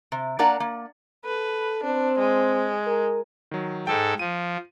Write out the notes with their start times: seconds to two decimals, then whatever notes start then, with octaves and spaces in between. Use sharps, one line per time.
0.12 C3
0.39 A#3 D4 A#4 D5 F#5 A5
0.60 A#3
1.25 A4 B4
1.84 C4 D4
2.19 G#3
2.87 A#4
3.51 D#3 F#3
3.87 G#2 A4 G5
4.19 F3 D#7